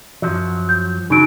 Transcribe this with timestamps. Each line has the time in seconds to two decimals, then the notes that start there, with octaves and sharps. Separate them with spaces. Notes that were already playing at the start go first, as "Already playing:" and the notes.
0.22 F#2 F3 F#3
0.69 G6
1.10 C#3 F#3 D#4 D7